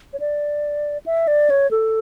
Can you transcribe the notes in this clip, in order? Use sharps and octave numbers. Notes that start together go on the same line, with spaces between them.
C#5
D5
E5
D5
C#5
A4